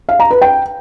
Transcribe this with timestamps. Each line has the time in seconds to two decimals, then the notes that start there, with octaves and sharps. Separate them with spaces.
0.09 F5
0.20 A#5
0.31 B4
0.42 G5